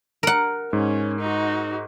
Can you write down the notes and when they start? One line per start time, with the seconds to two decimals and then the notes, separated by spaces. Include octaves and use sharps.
0.23 A#4 F#5
0.73 G#2 C#4
1.19 D#4 F#4